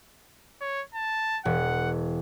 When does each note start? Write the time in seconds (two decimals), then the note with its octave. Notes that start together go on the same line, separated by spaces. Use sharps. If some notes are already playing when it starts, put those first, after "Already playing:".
0.61 C#5
0.94 A5
1.45 E1 F#5